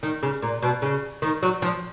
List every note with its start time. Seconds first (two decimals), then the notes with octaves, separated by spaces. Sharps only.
0.03 D#3
0.23 C#3
0.42 A#2
0.62 B2
0.82 C#3
1.22 D#3
1.43 F#3
1.62 F3